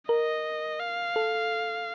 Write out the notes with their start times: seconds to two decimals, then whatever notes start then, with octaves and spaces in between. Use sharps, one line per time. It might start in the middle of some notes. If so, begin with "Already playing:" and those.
0.09 A#4 D#5
0.80 F5
1.16 A4